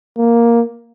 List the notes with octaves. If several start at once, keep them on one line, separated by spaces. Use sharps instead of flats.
A#3